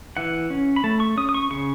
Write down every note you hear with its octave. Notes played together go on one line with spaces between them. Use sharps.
E3 F#5
C#4
B5
A3 A5
C#6
C#4 D#6
D#6
C#6
C#3 C#6